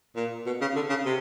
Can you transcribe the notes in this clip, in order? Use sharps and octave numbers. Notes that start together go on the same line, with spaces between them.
A#2
B2
C#3
D3
C#3
C3